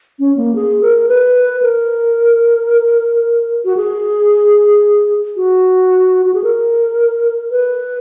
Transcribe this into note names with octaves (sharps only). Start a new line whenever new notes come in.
C#4
A#3
G#4
A#4
B4
A#4
F#4
G#4
F#4
F#4
G#4
A#4
B4